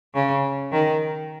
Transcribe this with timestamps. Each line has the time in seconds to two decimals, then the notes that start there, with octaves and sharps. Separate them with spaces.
0.15 C#3
0.72 D#3